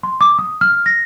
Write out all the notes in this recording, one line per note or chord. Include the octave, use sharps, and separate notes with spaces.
C6
D6
D#6
F6
A#6